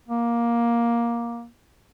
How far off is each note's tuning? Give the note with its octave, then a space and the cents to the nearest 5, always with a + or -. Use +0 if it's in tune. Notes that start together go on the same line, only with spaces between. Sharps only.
A#3 +15